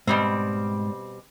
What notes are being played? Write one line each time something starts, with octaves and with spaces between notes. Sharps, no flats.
G#2 B2 G3 C4 D5